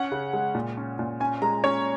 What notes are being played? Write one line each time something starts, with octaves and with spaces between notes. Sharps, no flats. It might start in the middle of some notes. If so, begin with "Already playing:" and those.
Already playing: C#4 F#5
C#3
G#3
A#2
C#4
A#2
C#4 G#5
G#3 A#5
C#4 C#5